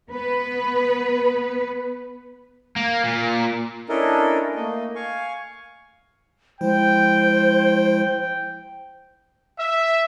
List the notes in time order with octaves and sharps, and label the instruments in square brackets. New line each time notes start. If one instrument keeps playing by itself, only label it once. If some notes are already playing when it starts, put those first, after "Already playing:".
[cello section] B3 B4
[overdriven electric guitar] A#3
A#2
[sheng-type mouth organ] C#4 D4 E4 A4 A#4 D#5
A3 A#3 D#5
F5 G#5 C#6
[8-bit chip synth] F3 G#3 E4 [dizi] C5 [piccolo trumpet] G5
[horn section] E5